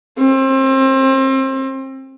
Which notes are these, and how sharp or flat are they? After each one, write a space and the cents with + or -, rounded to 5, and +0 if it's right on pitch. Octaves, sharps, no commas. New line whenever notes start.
C4 +30